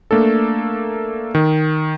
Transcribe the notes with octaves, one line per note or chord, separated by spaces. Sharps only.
A3 A#3 D4 A4
D#3